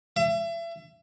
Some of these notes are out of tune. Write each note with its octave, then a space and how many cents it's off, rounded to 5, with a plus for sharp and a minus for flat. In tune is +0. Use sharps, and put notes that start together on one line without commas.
E5 +35